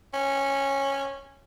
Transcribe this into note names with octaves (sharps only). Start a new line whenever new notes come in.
C#4